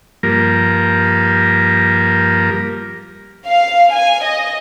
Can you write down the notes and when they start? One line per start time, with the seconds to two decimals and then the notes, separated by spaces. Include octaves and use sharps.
0.23 G2 F3 A#3 A#4
3.48 F5
3.92 G#5
4.25 D#5